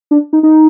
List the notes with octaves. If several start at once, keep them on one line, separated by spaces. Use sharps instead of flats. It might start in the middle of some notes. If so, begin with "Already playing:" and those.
D4
D#4
D#4